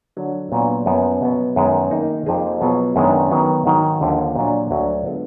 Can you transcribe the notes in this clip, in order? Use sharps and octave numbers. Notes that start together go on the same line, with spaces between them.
D3 F#3 D4
A#2 F#3 B3 D4
F#2 F3 B3
B2 F#3 B3
F#2 D#3 G#3 B3
D#3 A#3 D#4
F2 F3 A#3 D#4 G#4
B2 F#3 B3 F4 G#4
F#2 D#3 G#3 B3 D4
D#3 F#3 B3
G#2 D#3 F#3
D#2 D3 F3
A#2 F#3 D4
D2 D3 F#3
D3 G#3 B3 F4